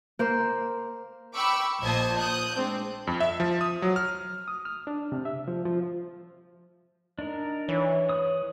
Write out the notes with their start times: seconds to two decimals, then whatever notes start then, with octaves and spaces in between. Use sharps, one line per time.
0.19 A#3 C5
1.35 G5 B5 C#6 D6 E6
1.82 A#1 A#2 C5 D#5 A5 G#6
2.18 D#6 F#6 G6
2.54 G#3 C4 D4
3.07 F2
3.20 E5
3.40 F3
3.61 D#6
3.82 F#3
3.96 F6
4.48 D#6
4.65 F6
4.87 D4
5.12 C3
5.25 E5
5.48 F3
5.65 F3
7.19 D4 D#4 A#4
7.68 E3 C#5
8.09 D#6 F#6